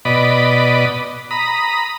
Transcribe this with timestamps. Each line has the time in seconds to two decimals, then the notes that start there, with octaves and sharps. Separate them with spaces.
0.05 B2 D5 D#5 B5
1.31 A#5 B5 D#6